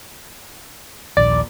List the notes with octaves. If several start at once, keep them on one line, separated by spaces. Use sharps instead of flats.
D#1 A#1 D#2 D5